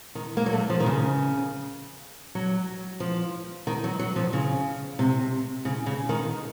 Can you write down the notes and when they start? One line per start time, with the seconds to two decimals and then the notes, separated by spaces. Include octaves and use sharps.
0.15 D#3
0.37 A#3
0.46 F#3
0.53 A3
0.70 F3
0.80 D#3
0.86 C#3
2.35 F#3
3.00 F3
3.67 D#3
3.84 F#3
3.99 F#3
4.16 F3
4.33 C#3
4.99 C3
5.65 C#3
5.86 C#3
6.09 D#3